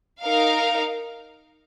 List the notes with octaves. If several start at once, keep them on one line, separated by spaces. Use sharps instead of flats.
D#4 A#4 F5